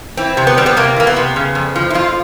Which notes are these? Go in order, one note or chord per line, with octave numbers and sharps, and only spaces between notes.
E3 C4
C3
B3
G3 C4
B3
C3 A#3
E3 A#3
B3
C3
C#3
F2
F3
E4
F2 F4